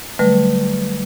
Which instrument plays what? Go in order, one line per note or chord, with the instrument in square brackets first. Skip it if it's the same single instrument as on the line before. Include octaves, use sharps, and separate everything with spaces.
[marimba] D3 F#3 G3 A3 B4